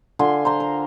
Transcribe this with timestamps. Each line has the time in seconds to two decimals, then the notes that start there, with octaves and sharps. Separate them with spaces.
0.19 D3 F4 G#5 C6
0.45 C5 A#5 C6
0.60 A#4